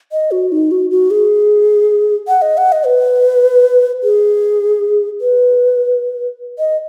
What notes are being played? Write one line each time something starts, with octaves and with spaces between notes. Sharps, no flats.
D#5
F#4
D#4
F#4
F#4
G#4
F#5
D#5
F#5
D#5
B4
G#4
B4
D#5